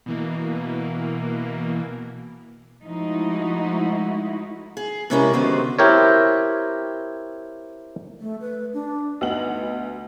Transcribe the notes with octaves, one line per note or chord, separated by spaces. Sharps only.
B2 E3 A#3
F3 G#3 A3 D#4 E4 F#4
G#4
C3 G#3 C#4 E4 G4 A#4
D3 D#3 F#3 B3 G4 C5
C4 E4 G4 A#4 C#5
A3
B4
D4
D2 B3 D#4 F#5 F#7